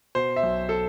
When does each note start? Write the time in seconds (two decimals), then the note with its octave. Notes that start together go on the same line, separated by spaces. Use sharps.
0.15 B2 C5
0.36 E5
0.43 B1
0.69 A4